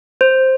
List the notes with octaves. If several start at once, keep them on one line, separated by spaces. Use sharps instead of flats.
C5